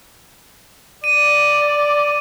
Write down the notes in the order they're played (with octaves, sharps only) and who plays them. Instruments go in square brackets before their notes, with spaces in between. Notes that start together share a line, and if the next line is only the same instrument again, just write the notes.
[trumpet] D5 [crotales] D#7